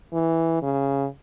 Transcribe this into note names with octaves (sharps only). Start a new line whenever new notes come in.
E3
C#3